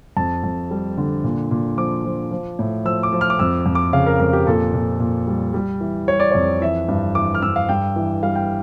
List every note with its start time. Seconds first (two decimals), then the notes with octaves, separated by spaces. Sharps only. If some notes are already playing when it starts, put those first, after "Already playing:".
0.17 F2 A5
0.44 F2
0.71 G3
0.97 D3
1.24 A#2
1.51 A#2
1.77 F3 D6
2.05 F3
2.31 F3
2.59 A2
2.85 F3 E6
3.03 D6
3.13 F3
3.21 F6
3.30 D6
3.39 F2 E6
3.66 F2
3.75 D6
3.93 C#3 F5
4.07 A#4
4.20 F2 A#4
4.33 G4
4.47 A#2 A4
4.74 A#2
5.00 A#2
5.27 G3
5.54 G3
5.81 E3
6.08 G3 C#5
6.20 D5
6.32 F2 C#5
6.61 E3 E5
6.88 G2
7.15 E3 D6
7.35 F6
7.42 G2 E6
7.56 F5
7.69 G2 G5
7.96 E3
8.23 G3 F5
8.35 G5